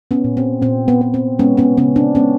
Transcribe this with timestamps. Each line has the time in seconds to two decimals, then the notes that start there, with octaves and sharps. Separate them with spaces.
0.11 B3 C#4
0.24 A#2
0.37 C4
0.62 A#2 C4
0.88 B3
1.01 B3
1.14 C4
1.39 G#3 B3 C#4
1.57 B3 C#4
1.77 C#3 B3 C#4
1.96 C4 D4
2.15 G#3 B3 C#4